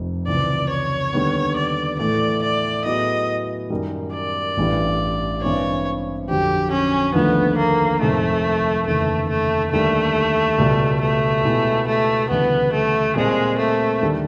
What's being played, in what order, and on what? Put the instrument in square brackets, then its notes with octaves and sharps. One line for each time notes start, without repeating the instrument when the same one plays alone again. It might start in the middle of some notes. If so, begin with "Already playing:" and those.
Already playing: [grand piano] F1 F2 C3
[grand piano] C#2 C3 E3 [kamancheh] D5
[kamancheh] C#5
[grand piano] D#2 D3 G3 B3
[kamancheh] D5
[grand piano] A2 E3 A3 [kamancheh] D5
[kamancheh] D5
[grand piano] A2 F#3 B3 E4 G#4 [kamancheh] D#5
[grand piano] F#2 D#3 G3
[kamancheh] D5
[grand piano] A1 G2 E3 G3
[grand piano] G2 E3 G#3 C4 E4 [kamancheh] C#5
[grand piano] F2 D3 F#3 [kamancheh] G4
[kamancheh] C#4
[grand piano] D#2 D3 F3 A3 [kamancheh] B3
[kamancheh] A#3
[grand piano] F2 C3 D#3 G#3 [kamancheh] A3
[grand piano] F1 D#2 C#3 E3 [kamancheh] A3
[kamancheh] A3
[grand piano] D#2 D3 G3 A#3 [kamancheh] A3
[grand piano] C#2 B2 G3
[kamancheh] A3
[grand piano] B2 G#3 B3 E4 G4
[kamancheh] A3
[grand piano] D2 C#3 E3 G3 [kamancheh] B3
[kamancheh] A3
[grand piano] A#2 G3 C4 [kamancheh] G#3
[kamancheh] A3
[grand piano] D#2 D3 G3